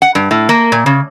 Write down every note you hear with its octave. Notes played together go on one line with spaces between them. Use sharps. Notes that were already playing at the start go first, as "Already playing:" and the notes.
F#5
G2
A2
A#3
A#2
C#3